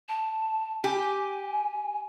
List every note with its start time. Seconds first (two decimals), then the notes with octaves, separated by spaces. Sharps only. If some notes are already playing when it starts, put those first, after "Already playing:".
0.09 A5
0.84 G4 G#5